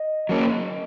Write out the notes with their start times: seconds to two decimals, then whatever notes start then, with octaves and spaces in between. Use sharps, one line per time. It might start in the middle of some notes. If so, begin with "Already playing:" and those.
Already playing: D#5
0.29 F#3 A#3 C#4